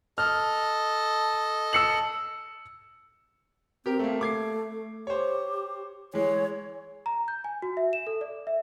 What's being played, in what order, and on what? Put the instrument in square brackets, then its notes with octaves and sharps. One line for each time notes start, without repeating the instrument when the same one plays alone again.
[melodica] A4 D#5 [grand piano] F6
[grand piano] E6 C#7 F#7
[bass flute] C4 [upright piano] G4 A#4
[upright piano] A3 A#3
[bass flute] A3 [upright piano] D6 G#6 C7
[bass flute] G4 [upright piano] C5 C#5
[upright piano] E3 G#3 [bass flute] C#5
[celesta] A#5
G6
G#5
F#4
E5
E7
A4
D5
E5